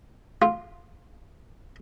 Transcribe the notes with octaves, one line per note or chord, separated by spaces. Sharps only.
F4